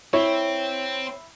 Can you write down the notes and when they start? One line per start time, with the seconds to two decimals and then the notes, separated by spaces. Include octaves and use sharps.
0.14 C4 E4 C#5